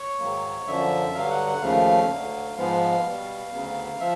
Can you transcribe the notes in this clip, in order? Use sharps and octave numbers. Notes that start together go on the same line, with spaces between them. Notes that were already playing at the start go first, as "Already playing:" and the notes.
Already playing: C#5
G#2 D#3 F#3 A#3
F#2 D3 F3 E5
G2 D3 F#3 F5
F#5
F#5
D#2 C#3 F3 A3 F5
D2 D3 F#3
G#2 F3 G#3 B3 F5
B2 G3 B3
D2 C#3 F#3 B3
F3 E5